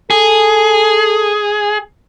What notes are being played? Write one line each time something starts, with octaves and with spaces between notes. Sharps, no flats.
G#4 A4